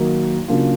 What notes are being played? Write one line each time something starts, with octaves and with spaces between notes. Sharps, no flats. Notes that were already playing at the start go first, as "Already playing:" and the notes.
Already playing: D#3 F#3 A#3 D#4
C#3 F#3 A#3 D4 F4